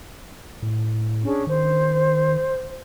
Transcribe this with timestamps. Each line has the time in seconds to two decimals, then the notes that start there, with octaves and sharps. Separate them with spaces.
0.62 A2
1.24 C#4 D4 G#4
1.47 D#3 C5